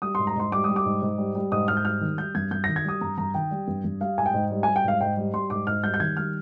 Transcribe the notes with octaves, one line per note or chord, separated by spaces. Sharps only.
G3 D#6
C6
G#2
A#5
G#2 C6
G3 D6
G3 D#6
D6
G#2
G#2
G3
G3
G#2 D#6
G#2 F6
G6
G3 F6
D#3
G3 G6
G2 G#6
G2 G6
A#6
D#3
G#6
G3 D#6
G2 A#5
G2 A#5
D#3 G5
G3
G2
G2
G3 F5
G#2 G#5
G5
G#2
G3
G#5
G3
G5
G#2 F5
G#2 G5
G3
G3 C6
G#2 D6
G#2 F6
G3 G6
G6
D#3 G#6
G3 F6